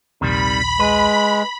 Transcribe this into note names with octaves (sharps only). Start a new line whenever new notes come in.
A#1 D#2 C3 D#3 G3 B5
G#3 B4